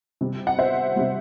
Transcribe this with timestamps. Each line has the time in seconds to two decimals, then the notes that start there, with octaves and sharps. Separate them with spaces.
0.21 C3 G3
0.47 F#5
0.59 C5 E5
0.96 C3 G3